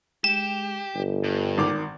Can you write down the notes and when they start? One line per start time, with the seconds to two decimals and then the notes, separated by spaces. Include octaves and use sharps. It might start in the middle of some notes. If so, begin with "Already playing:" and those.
0.24 G#3 G4 E7
0.95 G1
1.24 G2
1.58 G#1 D#3 D6